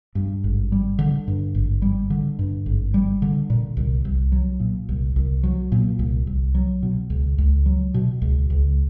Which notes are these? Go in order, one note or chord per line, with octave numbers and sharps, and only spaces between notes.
G2
G#1
G3
D3
G2
G#1
G3
D3
G2
G#1
G3
D3
A#2
C2
C2
F#3
A#2
C2
C2
F#3
A#2
C2
C2
F#3
B2
C#2
C#2
F#3
B2
C#2
C#2